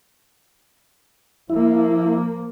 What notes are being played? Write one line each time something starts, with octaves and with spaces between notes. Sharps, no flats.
F3 A#3 E4